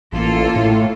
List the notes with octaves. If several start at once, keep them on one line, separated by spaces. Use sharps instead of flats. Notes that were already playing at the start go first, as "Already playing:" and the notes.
A1 A#3 F4 A4
A2